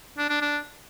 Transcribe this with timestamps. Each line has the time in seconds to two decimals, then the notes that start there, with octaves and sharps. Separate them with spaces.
0.18 D4
0.30 D4
0.42 D4